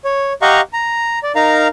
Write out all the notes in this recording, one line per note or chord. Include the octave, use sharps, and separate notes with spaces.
C#5
G4 D#5 F5 F#5 A#5 C#6
A#5
D5
D#4 A#4 F5 A#5